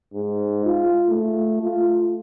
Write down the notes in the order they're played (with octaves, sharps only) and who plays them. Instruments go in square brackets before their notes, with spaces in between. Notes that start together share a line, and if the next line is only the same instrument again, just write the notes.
[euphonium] G#2
F4
A3
F4